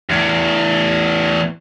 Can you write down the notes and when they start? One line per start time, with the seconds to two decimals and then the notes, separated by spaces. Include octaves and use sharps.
0.10 E2 A2